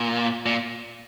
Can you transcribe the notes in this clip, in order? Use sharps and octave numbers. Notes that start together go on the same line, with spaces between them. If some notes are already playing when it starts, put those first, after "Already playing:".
Already playing: A#2
A#2